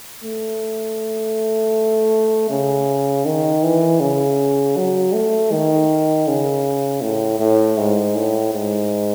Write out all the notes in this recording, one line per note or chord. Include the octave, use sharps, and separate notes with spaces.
A3
C#3
D#3
E3
C#3
F#3
A3
D#3
C#3
A2
A2
G#2
A2
G#2